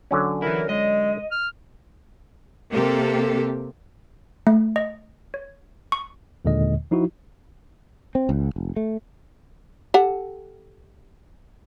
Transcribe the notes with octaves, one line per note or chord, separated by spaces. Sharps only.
D3 F#3 C#4
E3 E4 A#4
G#3 D#5
F6
C3 A#3 G4 A4
A3
D#5
C#5
C#6
D#2 A#2 D3 G#3 D#5
F3 D#4 E4 F#4
C4
C#2
F1
A3
G4 A4 F#5